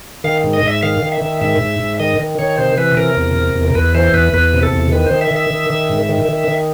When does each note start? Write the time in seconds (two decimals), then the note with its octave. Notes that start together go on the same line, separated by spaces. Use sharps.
0.24 D#3 F5
0.44 G#2
0.53 D#5
0.63 G#2 E5
0.83 D#3 F5
1.02 D#3
1.12 E5
1.21 D#3
1.41 G#2 E5
1.61 G#2
1.80 G#2
2.00 D#3 D#5
2.19 D#3
2.39 D#3 C#5
2.58 C3 C5
2.77 E3 B4
2.97 C3 A#4
3.16 E2
3.36 C3
3.56 E2
3.67 A#4
3.75 E2 B4
3.94 E3 C5
4.14 E2 B4
4.34 E2 B4
4.53 C3
4.63 A4
4.73 E2
4.92 D#3 B4
5.07 D#3 C5
5.21 E5
5.31 D#3
5.36 E5
5.50 D#3
5.70 D#3
5.90 G#2
6.09 D#3
6.29 D#3
6.48 D#3